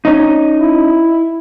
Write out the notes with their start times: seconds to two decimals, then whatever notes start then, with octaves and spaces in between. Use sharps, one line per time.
0.05 C#4 D#4
0.60 E4